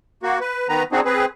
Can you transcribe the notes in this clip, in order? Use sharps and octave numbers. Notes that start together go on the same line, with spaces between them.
A#3 F#4
B4
D#3 B3 B4 A#5
C4 D4 D#4 F#4 G#4
C4 G#4 B4